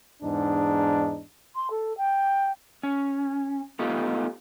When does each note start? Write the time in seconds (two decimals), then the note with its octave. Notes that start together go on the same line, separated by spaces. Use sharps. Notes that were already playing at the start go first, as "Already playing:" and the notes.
0.23 E2 G#2 D4 D#4
1.55 C6
1.70 A4
1.97 G5
2.83 C#4
3.79 A3 B3 D#4 F4 G4